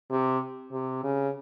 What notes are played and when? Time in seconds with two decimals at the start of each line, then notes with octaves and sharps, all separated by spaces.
0.11 C3
0.72 C3
1.03 C#3